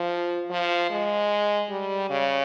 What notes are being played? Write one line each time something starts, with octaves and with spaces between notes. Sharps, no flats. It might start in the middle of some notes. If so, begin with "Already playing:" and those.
Already playing: F3
F3
G#3
G3
C#3